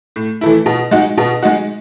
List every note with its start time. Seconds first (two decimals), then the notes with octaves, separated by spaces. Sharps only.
0.16 A2
0.41 E3 A3 E4
0.66 B2
0.91 G#3 D#4 F#4
1.18 B2
1.42 G#3 D#4 F#4